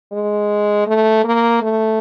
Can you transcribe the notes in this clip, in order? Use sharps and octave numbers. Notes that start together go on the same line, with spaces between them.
G#3
A3
A#3
A3